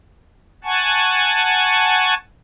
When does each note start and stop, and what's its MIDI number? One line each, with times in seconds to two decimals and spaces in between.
0.64 2.14 78
0.64 2.14 80
0.64 2.14 81
0.64 2.14 85